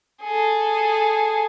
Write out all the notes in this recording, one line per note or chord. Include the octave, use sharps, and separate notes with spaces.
G#4 A4